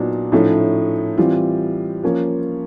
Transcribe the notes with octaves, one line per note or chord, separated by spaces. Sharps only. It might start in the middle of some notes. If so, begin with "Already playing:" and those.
Already playing: A#2 F#3 B3 D4 D#4
A2 F3 A3 C#4 D#4
E3 G3 C4 F4
F3 A#3 C#4